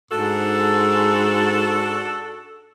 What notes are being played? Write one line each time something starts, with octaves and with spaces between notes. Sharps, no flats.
G#2 D4 F#4 A4